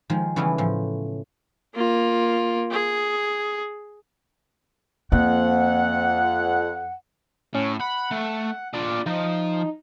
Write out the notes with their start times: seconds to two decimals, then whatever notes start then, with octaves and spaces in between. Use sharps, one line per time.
0.10 D#3 F3 G#3
0.36 C#3 E3 G3 A3 B3 C#4
0.58 A2 F3
1.75 A#3 F4
2.72 G#4
5.12 F2 A#3 F#5
7.54 A2 C#4
7.80 F#5 B5
8.11 A3
8.73 D4 F4 D5
9.06 F3 D#4